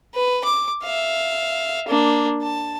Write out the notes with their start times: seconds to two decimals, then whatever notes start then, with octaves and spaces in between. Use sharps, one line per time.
0.15 B4
0.44 D6
0.83 E5 F5
1.88 A#3 D4
2.43 A5